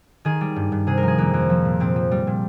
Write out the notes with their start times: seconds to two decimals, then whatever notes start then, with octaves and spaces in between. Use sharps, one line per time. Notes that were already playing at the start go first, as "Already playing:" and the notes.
0.25 D#3 G#4
0.41 G3
0.56 G2
0.72 G2
0.87 C3 G#4
0.98 A#4
1.03 F3 G#4
1.18 F2 A#3
1.33 F2
1.50 F3
1.65 A#2
1.80 A#2 C4
1.96 F3
2.11 G3
2.27 A#2